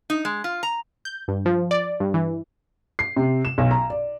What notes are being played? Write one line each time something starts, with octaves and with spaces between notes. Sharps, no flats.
D#4
G#3
F4
A#5
G6
G2
F3
D5
G2
E3
C7
C3
E7
B1
A#5
D5